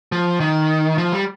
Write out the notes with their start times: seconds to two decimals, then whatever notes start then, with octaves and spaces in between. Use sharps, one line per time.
0.12 F3
0.40 D#3
0.98 F3
1.12 G3